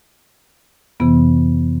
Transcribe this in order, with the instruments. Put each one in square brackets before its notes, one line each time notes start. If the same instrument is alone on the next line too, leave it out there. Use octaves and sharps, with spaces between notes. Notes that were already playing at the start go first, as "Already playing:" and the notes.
[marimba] F2 C3 E3 B3